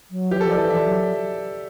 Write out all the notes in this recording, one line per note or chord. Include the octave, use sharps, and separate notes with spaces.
F#3
E3 G4
F#3
A4
F3
D5
E3
E5
F#3